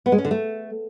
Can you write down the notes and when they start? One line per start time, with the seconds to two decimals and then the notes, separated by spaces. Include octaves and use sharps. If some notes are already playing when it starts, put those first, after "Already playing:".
0.06 B3
0.12 G#3
0.18 C#4
0.25 D3
0.31 A3